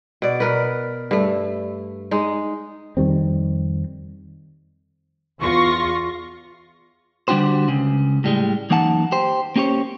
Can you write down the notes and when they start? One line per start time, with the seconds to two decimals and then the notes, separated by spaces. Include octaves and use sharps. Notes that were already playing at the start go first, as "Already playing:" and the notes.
0.22 B2 D5
0.40 B2 A#4 B4
1.11 G2 A3
2.11 G#3 D#4
2.97 F2 D#3 G3 C4
5.41 E2 F4 C6 C#6 A#6
7.28 D3 G3 D4 F#4 G4 C5
7.68 C#2 C#3
8.24 A2 G3 G#3
8.70 F#2 E3 A#3 D#4 F#5 A5
9.12 G4 C5
9.56 A#3 C#4 G4 C5 C#5